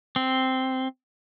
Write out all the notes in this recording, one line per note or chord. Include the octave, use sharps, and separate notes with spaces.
C4